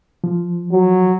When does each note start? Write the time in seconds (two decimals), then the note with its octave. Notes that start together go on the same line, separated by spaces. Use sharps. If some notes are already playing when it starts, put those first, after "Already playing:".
0.24 F3
0.71 F#3